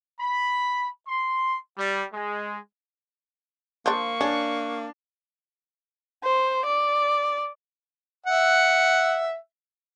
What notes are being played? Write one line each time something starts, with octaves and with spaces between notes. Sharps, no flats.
B5
C6
G3
G#3
F3 A#3 D4 C#6
C#4 D4
C5
D5
E5 F#5